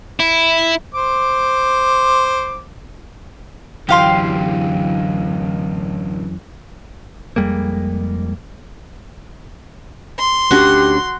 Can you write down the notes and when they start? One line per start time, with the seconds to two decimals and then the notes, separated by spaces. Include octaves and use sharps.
0.20 E4
0.95 C5 D6
3.89 F#2 D3 E3 F#3 G4 F5 C6
7.36 F2 G3 G#3 A#3
10.19 C6
10.51 D2 C#4 D4 F#4 G4